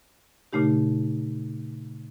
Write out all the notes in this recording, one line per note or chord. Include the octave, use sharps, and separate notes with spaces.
A#2 C#3 A3 D#4 G4